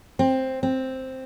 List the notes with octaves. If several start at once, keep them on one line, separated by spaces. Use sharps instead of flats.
C4
C4